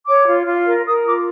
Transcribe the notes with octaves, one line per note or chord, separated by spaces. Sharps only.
C#5 D6
F4
F4
A#4
A#4 D#6
F4 D6